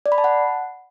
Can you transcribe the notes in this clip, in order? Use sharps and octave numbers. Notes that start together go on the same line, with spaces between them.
D5
B5
A5
F#5